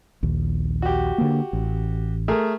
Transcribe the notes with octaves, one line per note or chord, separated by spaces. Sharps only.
A#1 D#2
F#4 G4
D3 A#3
A1
A3 G#4 A#4